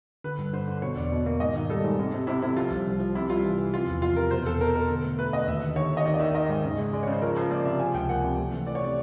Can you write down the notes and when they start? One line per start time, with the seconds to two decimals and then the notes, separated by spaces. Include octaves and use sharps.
0.24 D3 B4
0.38 G2
0.53 D3 C5
0.67 D3
0.82 B2 C#5
0.96 E2 D5
1.11 B2
1.26 A#3
1.40 G#2 D#5
1.55 D#3
1.70 G3 A4
1.84 G#2
1.99 C3
2.13 C3
2.27 C3 E4
2.42 C3 E4
2.56 F3 F4
2.72 C2
2.86 C2
3.00 F3
3.15 C3 E4
3.29 G3 F4
3.44 E3
3.58 E3
3.74 F3 F4
3.88 E2
4.02 C3 F4
4.16 C3 A#4
4.31 B2 C5
4.46 E2 A4
4.61 B2 A#4
4.74 B2 A#4
4.89 D3
5.04 A3
5.19 A3 B4
5.33 D3 D#5
5.48 D#2 E5
5.62 D#2
5.76 D#2 C#5
5.92 D#2
5.97 D#5
6.05 D#3 D5
6.14 D#5
6.20 D#3 E5
6.35 D#3 D#5
6.49 G#2
6.64 C#3
6.78 G#3
6.93 G#3 D5
7.03 C#5
7.07 C#3
7.12 C5
7.22 F3 A#4
7.36 F3 C5
7.51 A#3 D5
7.65 C3 E5
7.79 F3 G#5
7.95 C#2 G5
8.09 A#3 F#5
8.24 C3
8.38 A3
8.53 E3
8.67 E3 D5
8.75 C#5
8.82 C3 D5